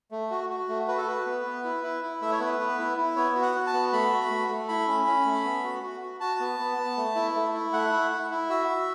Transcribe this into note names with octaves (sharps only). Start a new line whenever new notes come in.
A3
F#4
F#4
A3
F#4 B4
A4
F#4 B4
B3
B3
E4
E4
E4
A3 E5
C#5
B3 B4
B3
E4
E4
B3 C#5
F#4
F#5
F#4
A5
B3
A3 B5
F#4
A3
A3
E4 B5
C#4
C#4
A3
B3
F#4
F#4
F#4
F#4 A5
B3
B3
B3
A3
E4
A3
E4
A3 F#5
E4
E4
E4
F#4 E5
F#4